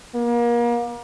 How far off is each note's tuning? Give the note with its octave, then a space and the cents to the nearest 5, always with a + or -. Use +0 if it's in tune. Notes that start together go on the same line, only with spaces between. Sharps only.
A#3 +35